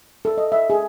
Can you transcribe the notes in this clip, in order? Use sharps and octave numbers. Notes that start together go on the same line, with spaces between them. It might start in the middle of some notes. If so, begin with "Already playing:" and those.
A4
D#5
E5
G#4